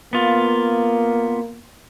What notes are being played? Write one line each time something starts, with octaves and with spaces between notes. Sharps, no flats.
A#3 B3 F4